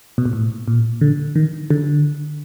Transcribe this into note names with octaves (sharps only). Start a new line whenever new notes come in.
B2
A#2
A2
A#2
D3
D#3
D3